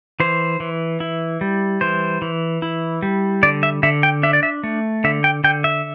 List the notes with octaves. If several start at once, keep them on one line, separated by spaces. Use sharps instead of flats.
E3 C5
E3
E4
G3
E3 C5
E3
E4
G3
D3 D5
E5
D3 E5
G5
D4 E5
D5
E5
A3
D3 E5
G5
D3 G5
E5